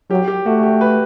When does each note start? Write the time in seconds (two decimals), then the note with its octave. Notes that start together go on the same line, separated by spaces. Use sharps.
0.10 F#3 G4
0.28 G4
0.46 A3 F#4
0.63 G4
0.81 B4